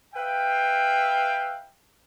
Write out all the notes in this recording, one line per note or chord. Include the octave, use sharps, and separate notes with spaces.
B4 E5 F5 G5